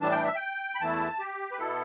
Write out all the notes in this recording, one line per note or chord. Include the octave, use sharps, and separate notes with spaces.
A2 E3 G3 D4 A5
G5
E5
G5
B5
E2 E3 A3 E4 A5
G4
B4
B2 B3 E4 A4